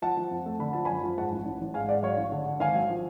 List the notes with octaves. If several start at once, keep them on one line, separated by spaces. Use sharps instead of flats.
F3 F#5 A5
F3
F2
A3
D3 B5
F3 A5
F#2 G#5 B5
F3
G#2 F#5 A5
A1
A1
A1
G#2 F5 G#5
G#2 D5 F#5
F#3 C#5 F5
A1
D3
D3
G#1 F5 G#5
F#3
F3